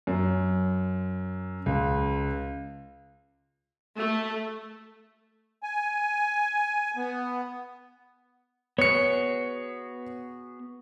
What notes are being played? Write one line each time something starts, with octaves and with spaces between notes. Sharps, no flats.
F#2
C#2
A3
G#5
B3
B3 F#4 G#4 C#5 C#7